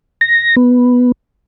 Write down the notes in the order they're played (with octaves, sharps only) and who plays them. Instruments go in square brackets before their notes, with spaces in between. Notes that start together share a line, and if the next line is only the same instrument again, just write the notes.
[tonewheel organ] A#6
B3